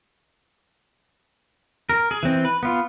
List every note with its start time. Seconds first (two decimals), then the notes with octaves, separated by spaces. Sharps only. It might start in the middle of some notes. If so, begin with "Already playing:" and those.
1.90 A#4
2.11 G#4
2.23 E3 C4
2.45 B4
2.63 B3 F4